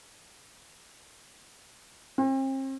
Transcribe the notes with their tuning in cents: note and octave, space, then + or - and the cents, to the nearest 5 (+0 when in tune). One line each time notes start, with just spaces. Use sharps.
C4 +40